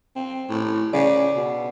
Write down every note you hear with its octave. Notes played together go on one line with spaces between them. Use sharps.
C4
A2
C#3 D5
B2